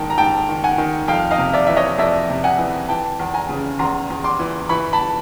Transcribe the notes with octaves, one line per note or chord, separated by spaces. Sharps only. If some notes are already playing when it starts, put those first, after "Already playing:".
Already playing: G#2 D#3 G5 A5
A#5
G#2 G5 A5
D#3
F#5 G#5
D#3
F2 F5 G5
D#5 F5
C3
D5 E5
E3 E5
C#5 D#5
F2 D5 E5
C3
F#5 G#5
E3
E3 G5 A5
E2
G#5 A#5
C#3
E2 A#5 C6
E2
C6 D6
E3
E3 B5 C#6
A5 B5